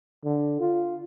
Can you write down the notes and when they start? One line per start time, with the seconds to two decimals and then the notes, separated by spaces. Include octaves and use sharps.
0.25 D3
0.60 F4